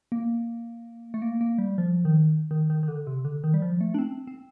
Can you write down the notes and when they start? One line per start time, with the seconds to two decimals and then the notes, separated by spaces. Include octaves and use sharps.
0.12 A#3
1.14 A3
1.22 A#3
1.41 A#3
1.58 G3
1.78 F3
2.05 D#3
2.51 D#3
2.70 D#3
2.83 D#3
2.88 D3
3.07 C3
3.25 D3
3.44 D#3
3.54 G3
3.62 F3
3.81 A3
3.94 D4
3.99 C4
4.27 C4